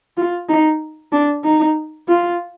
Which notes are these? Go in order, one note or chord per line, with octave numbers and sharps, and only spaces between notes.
F4
D#4
D4
D#4
F4